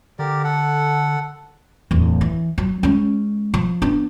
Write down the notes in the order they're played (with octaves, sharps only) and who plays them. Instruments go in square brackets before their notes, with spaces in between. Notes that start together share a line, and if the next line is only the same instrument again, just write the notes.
[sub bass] D3 [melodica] G4 A#4 D5
[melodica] A4 F#5
[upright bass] D1 E2
E3
F#3
G#3 C#4
F3
B3 D4